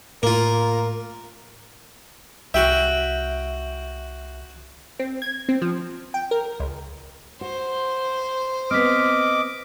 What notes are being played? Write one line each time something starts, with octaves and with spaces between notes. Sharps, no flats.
A2 A#3 F4 A#4
C2 F#4 E5 G5
C4
G#6
C4
F3
G5
A#4
C#2
F#4 C5
B3 C4 D#5 D6 F6 B6